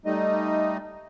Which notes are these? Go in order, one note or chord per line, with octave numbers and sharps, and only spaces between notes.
G3 A3 D#4 D#5